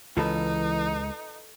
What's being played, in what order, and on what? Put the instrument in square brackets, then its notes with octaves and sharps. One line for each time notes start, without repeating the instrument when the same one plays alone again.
[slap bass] C#2 [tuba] E3 [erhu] D#4 [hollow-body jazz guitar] F4 A4 B4